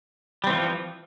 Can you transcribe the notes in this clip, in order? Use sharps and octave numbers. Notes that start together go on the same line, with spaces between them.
E3 F3 G3 C4